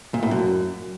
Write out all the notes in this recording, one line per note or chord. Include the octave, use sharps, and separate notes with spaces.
A#2
A2
F#2